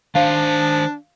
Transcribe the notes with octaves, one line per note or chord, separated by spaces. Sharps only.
D#3 D4 C5 F5